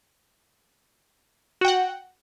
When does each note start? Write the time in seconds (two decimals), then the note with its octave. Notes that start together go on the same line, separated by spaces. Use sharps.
1.61 F#4
1.65 G5
1.68 F#5